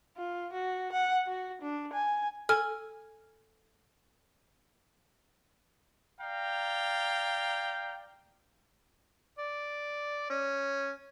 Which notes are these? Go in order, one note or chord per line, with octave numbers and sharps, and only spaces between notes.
F4
F#4
F#5
F#4
D4
G#5
A4 G#5 F6
D5 F5 G5 A#5
D5
C#4